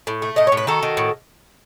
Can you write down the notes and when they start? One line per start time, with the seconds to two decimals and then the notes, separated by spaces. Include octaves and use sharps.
0.07 A2
0.22 A3
0.36 A2 D#5
0.47 C#5
0.52 A2
0.57 B4
0.67 D#3 F#4 A4
0.83 D#3
0.97 A2